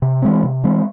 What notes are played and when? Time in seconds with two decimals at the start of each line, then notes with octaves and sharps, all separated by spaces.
0.02 C3
0.22 E3 G#3 C4
0.44 C3
0.64 E3 G#3 C4